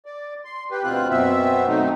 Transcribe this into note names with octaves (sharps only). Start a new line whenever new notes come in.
D5
C6
G4 B4
D2 B2 C4 F4 F#6
F#2 B2 B3 C4 E5
F#3 A3 C4 D#4